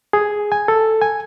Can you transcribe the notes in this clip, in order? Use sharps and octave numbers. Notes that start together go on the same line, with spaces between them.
G#4
G#5
A4
G#5